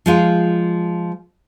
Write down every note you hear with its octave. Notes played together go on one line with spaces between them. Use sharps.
F3 G#3 F4